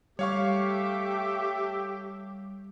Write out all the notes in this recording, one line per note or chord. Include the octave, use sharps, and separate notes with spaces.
G3 A3 G4 C#5 E5 F5 C#6 D6